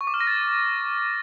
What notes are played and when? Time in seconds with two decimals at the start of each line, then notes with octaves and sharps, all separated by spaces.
0.01 C#6
0.07 D6
0.14 F6
0.20 A#6
0.27 A6